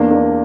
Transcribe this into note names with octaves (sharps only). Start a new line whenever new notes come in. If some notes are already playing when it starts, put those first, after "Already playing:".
Already playing: E2 A#3 D4
A#3 D4